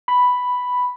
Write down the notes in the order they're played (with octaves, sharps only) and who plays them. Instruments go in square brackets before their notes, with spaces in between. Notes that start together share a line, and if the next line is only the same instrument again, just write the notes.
[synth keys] B5